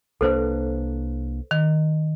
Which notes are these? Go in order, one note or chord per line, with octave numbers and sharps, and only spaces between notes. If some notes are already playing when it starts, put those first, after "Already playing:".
C2 A#3 D4 A4 B4 C5
D#3